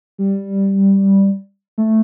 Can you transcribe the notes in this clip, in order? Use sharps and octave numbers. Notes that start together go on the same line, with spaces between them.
G3
A3